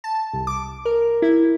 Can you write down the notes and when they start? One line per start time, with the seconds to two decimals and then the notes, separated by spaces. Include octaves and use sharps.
0.04 A5
0.33 C2
0.47 D6
0.85 A#4
1.22 E4